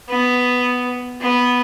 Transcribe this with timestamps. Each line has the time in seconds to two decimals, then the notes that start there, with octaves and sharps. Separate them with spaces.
0.09 B3
1.21 B3